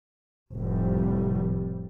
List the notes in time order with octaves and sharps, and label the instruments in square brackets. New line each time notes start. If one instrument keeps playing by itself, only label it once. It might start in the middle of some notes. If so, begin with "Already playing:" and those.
[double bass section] F1 A2 G3